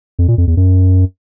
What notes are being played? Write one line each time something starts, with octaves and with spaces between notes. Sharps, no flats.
F2
A#2
F2
E2
F#2